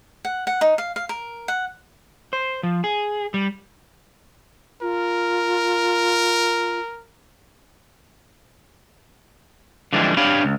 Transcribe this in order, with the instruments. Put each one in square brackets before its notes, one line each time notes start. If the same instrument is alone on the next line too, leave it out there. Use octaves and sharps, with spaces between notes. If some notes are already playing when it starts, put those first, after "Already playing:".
[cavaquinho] F#5
F#5
D#4
F5
F5
A#4
F#5
[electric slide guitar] C5
F3
G#4
G3
[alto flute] F4 [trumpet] A#4
[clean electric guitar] D3 E3 F3 G3 G#3 D4
D4 G4 C#5 F5 G5 B5
C#2